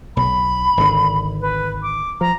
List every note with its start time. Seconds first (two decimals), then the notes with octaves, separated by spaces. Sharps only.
0.17 B1 B5
0.77 G#1 D3
1.41 B4
1.82 D6
2.21 F3 A#5